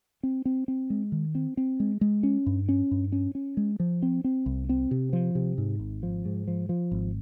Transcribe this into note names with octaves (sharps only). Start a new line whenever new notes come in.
C4
C4
C4
G#3
D#3
C4
C4
G#3
G#3
C#4
G2
C#4
G2
C#4
C#4
G#3
F3
C4
C4
C2
C4
C3
F3
C3
G#2
G#1
F3
G#2
F3
F3
G#1